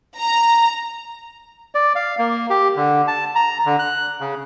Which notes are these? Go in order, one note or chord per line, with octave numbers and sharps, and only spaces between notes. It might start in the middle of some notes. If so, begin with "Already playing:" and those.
A#5
D5
F5
A#3
G4
D3
A5
A#5
D3
F#6
C#3